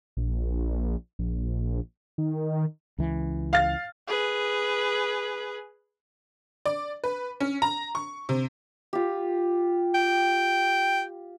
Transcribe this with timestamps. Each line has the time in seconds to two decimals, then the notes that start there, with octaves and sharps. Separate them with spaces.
0.17 A#1
1.19 A#1
2.18 D#3
2.98 C#2 E3
3.53 F5 F6 A6
4.08 G#4 B4
6.66 D5
7.04 B4
7.40 C#4
7.62 A#5
7.95 C#6
8.29 C3
8.93 F4 G4
9.94 G5